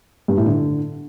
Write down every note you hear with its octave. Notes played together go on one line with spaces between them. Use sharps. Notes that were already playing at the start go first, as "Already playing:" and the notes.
G2
A2
D3